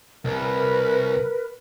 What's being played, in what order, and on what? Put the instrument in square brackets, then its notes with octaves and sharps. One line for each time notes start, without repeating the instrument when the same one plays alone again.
[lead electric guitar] C2 [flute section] A#4 B4